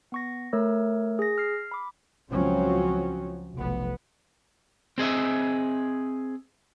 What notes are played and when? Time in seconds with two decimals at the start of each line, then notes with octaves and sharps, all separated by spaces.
0.12 B3 C#6 A#6
0.53 A3 A#4 C#5 E6
1.19 G#4 A#6
1.38 F6 C7
1.71 B5 D6
2.31 C#2 F3 F#3 C4 C#4
3.55 F1 B1 B3
4.98 C4 G#4 D#5 E5